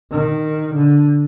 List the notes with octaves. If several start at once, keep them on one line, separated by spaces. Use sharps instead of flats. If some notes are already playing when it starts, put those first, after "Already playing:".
D#3
D3